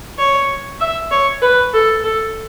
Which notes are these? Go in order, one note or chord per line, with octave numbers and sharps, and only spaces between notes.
C#5
E5
C#5
B4
A4
A4